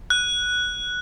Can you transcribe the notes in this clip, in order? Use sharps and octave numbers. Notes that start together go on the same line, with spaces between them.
F#6